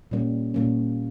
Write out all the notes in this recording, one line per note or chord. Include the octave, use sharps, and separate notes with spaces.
A#2 G3 A#3 C#4
A#2 G3 A#3 C#4